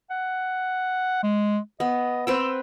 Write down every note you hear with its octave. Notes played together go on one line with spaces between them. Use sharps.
F#5
G#3
B3 D#5
C4 B4 G5 E6